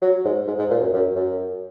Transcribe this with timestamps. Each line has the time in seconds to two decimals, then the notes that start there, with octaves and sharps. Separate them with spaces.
0.02 F#3
0.25 G#2
0.47 G#2
0.58 G#2
0.70 A#2
0.81 F#2
0.93 F#2
1.15 F#2